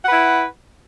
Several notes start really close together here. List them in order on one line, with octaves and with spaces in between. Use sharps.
F#5 B4 E4